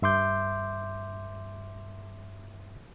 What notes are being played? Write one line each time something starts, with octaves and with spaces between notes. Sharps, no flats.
G2 E5 C6 D6 G6